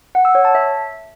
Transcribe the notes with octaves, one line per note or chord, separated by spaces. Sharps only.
F#5
E6
C#5
A5
E5